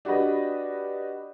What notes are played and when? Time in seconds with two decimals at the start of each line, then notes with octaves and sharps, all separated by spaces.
0.05 D4 F#4 G4 B4 D#5